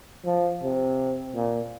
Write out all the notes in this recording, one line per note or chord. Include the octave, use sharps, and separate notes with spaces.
F3
C3
A#2